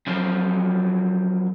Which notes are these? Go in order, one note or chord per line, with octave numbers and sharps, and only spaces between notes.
F#2 F3